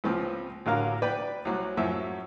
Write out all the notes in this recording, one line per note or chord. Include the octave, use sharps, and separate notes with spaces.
C#2 E3 F3 C4
A1 D3 F#3 A#4 F5 A#5
B4 D5 G5 B5
C2 F#3
F#2 A2 F3 E5